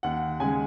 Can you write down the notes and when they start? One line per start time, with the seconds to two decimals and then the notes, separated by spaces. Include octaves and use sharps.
0.03 D#2 F#5
0.40 C#3 G#3 G#5